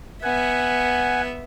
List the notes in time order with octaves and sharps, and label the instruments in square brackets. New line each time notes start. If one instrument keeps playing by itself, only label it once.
[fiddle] B3 E5 [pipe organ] F#5 G#5